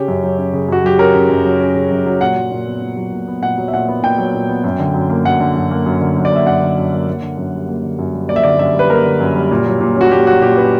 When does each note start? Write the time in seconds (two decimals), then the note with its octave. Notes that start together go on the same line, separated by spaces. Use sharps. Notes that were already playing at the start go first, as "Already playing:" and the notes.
Already playing: C#3 C#4 G4
0.08 F#2
0.24 F#3
0.38 C#4
0.53 C#3
0.69 F#2 F#4
0.84 F#3 G4
0.99 C#4 A#4
1.15 C#3
1.30 F#2
1.45 F#3
1.60 C#4
1.76 C#3
1.91 F#2
2.06 F#3
2.21 A#2 F#5
2.36 F#3
2.52 A#2
2.66 B3
2.82 A#2
2.97 F#3
3.12 A#2
3.27 B3
3.43 A#2 F#5
3.58 F#3
3.68 E5
3.74 A#2 F#5
3.88 B3
4.03 A#2 G5
4.18 F#3
4.34 A#2
4.49 B3
4.64 F#2
4.79 D3
4.94 F#2
5.10 A#3
5.25 F#2 F#5
5.40 D3
5.56 F#2
5.71 A#3
5.86 F#2
6.01 D3
6.17 F#2
6.25 D5
6.32 A#3 E5
6.46 F#2 F#5
6.62 D3
6.77 F#2
6.92 A#3
7.08 A#3
7.22 D3
7.37 F#2
7.53 G3
7.68 A#3
7.84 D3
7.99 F#2
8.13 G3
8.29 A#3 D5
8.36 E5
8.44 D3 D5
8.59 F#2 E5
8.74 G3 B4
8.90 A#3 A#4
9.05 D3
9.20 F#2
9.35 G3
9.51 A#2
9.66 F#3
9.81 A#2
9.96 C#4 F#4
10.11 A#2 G4
10.26 F#3 F#4
10.42 A#2 G4
10.57 C#4 B4